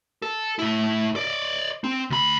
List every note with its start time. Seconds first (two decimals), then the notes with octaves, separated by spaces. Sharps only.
0.22 A4
0.59 A2 E4
1.16 D5 D#5
1.84 C4
2.10 D2 B5